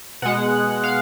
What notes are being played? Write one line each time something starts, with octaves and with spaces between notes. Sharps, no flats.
B2 G#3 F#5
F5